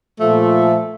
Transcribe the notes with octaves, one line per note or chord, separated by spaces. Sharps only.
A#2 F3 A3